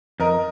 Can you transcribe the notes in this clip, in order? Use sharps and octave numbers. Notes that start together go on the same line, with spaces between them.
F2 A#4 D#5